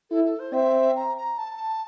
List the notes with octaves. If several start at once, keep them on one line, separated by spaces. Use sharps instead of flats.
E4 A4
A4
C5
C4 E5
A#5
A#5
A5